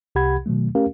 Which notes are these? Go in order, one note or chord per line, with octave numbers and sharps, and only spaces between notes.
C2 C3 G4 F#5 B5 G#6
B2 D#3 F#3 A3
A3 C#4 G4 A#4 F5